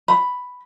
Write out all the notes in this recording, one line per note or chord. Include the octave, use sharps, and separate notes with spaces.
B5